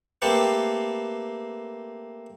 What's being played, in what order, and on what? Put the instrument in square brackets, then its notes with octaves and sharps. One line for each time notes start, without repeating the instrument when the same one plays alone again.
[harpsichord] A3 A#3 C4 G4 A4 B4